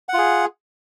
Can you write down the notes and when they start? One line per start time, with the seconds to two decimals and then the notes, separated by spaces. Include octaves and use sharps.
0.09 F#5
0.13 F4
0.18 G#4